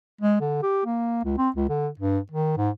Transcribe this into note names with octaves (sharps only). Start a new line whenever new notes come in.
G#3
D3
G4
A#3
C#2
C4
C#2
D3
G2
D#3
G#2